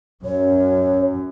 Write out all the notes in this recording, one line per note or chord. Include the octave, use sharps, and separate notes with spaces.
F#2 C#5